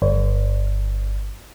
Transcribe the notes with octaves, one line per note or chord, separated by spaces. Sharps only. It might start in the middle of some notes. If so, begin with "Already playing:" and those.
G1